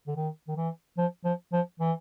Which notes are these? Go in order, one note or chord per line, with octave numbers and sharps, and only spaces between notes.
D3
D#3
D#3
E3
F3
F3
F3
E3